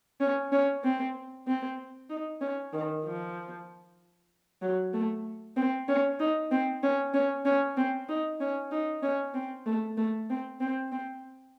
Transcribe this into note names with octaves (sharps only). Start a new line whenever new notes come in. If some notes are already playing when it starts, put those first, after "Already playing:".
C#4
C#4
C4
C4
D#4
C#4
D#3
F3
F#3
A3
C4
C#4
D#4
C4
C#4
C#4
C#4
C4
D#4
C#4
D#4
C#4
C4
A3
A3
C4
C4
C4